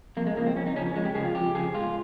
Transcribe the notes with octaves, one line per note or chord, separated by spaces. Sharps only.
F2 A#3
G#3
C#3 F3 A#3
C4
F2 C#4
D#4
C#3 F3 C#4
C#4
F2 G#3
G4
C#3 F3 G#4
F4
F2 G4
C#3 F3 G#4
G#2 F4